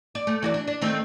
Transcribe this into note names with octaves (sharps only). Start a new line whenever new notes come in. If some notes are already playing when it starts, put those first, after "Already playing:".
D5
A3
E3 F#4 D5
D4
D4
D#3 A3 C4